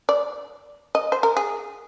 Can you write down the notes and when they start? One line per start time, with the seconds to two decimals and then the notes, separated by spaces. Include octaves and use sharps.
0.09 D5
0.95 D#5
1.12 C5
1.23 A#4
1.37 G#4